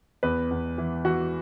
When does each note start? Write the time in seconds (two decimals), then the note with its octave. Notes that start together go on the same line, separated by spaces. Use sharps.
0.23 E2 B4
0.51 E2
0.78 E3
1.05 E3 F#4